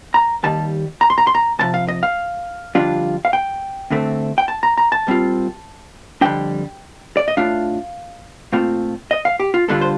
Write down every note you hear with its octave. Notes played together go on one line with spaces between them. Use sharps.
A#5
D#2 D#3 G3 A5
A#5
C6
A#5
C6
A#5
C2 C3 F3 A5
F5
D#5
F5
F2 D3 G3 D4 F4
F5
G5
D2 D3 A3 C4
G5
A5
A#5
A#5
A5
A#2 G3 C4 F4
F2 D3 G3 D4 G5
D5
D#5
A2 A3 D4 F4 F5
A#2 A3 C4 F4
D#5
F5
G4
F4
G2 D3 G3 D4 F4 A4
C5